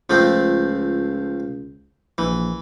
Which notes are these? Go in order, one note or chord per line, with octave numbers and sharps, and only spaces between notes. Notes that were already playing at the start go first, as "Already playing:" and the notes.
C#2 F3 A3 C4
A#1 E3